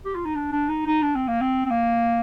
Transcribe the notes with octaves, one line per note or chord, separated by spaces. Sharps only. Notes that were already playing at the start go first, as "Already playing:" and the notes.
G4
F4
D#4
D4
D4
D#4
D#4
D4
C4
A#3
C4
C4
A#3